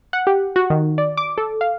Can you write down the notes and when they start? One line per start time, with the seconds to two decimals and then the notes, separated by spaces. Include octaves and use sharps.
0.13 F#5
0.27 G4
0.56 F#4
0.70 D#3
0.98 D5
1.17 D6
1.38 A4
1.61 F5